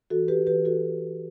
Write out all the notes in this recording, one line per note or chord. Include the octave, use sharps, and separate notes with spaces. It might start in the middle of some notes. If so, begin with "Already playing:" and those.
E3 F#4 A4
G4 B4
E3 G4 B4
F#4 A4